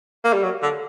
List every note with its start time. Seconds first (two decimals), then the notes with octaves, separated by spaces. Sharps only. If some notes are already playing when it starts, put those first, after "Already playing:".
0.24 A#3
0.33 G3
0.43 F#3
0.63 D3